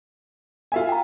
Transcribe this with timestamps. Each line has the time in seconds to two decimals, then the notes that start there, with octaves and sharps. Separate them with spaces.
0.72 F4 E5 G#5
0.89 G5 A#5